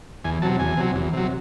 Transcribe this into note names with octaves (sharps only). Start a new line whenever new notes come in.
E2 G#5
C3 F#3 A5
E2 G#5
C3 F#3
E2
C3 F#3